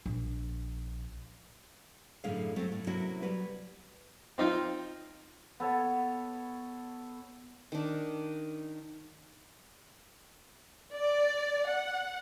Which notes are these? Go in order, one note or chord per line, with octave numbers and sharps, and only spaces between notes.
A#1
F#2 A2 D3 G#4 F5
F#3 A3 C4
A2
C3 F#3 A#3 C#4 E4 F#4
F#3 G3 F#4 B4
C4 D#4 F4 G5
B3 A4 C#5
D#3 D4
D5
F#5